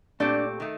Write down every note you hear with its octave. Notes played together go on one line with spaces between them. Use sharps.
A#2 A3 C4 D4 G4
D#3 A3